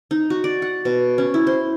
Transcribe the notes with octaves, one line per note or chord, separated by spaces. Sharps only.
D#4
F#4
D5
F#5
B2
C#4
E4
C5